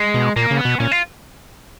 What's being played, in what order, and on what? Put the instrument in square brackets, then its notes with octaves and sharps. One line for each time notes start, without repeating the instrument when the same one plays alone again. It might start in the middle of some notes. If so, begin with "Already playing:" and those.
Already playing: [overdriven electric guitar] G#3
[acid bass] B2
[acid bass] A#2 [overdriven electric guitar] A#3
[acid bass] C#3
[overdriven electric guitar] B3
[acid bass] B2
[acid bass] A#2 [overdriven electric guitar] C#4
[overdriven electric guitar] F4